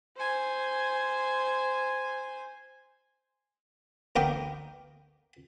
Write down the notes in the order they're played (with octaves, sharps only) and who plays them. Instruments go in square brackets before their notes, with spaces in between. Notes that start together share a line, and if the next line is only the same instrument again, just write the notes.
[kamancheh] C5 G#5
[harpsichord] D2 B3 A#4 G5 D6